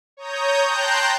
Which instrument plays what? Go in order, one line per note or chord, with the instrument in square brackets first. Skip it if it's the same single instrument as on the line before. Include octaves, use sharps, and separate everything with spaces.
[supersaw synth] C#5 A#5 D#6 G6
G5 A5 A#5 C6 F#6 G6